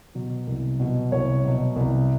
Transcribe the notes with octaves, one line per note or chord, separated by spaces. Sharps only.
B2 F#3
C2
B2 F#3
C2 C#5
B2 F#3
C2